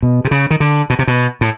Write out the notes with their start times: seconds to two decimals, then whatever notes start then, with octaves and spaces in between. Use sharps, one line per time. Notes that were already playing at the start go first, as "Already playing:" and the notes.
0.03 B2
0.25 C3
0.31 C#3
0.50 D#3
0.60 D3
0.90 B2
0.99 C3
1.07 B2
1.41 A2